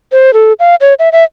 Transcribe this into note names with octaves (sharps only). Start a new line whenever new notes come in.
C5
A4
F5
C#5
E5
E5